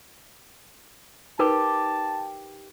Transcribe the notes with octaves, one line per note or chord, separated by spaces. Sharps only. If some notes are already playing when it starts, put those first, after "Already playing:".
D#4 G4 A#4 B4 A5